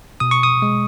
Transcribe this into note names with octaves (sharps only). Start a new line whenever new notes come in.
B2 D#6
C#6
D#6
G#3